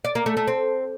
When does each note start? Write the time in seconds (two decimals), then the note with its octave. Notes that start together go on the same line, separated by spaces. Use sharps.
0.05 D5
0.15 A#3
0.26 A3
0.37 A3
0.47 C4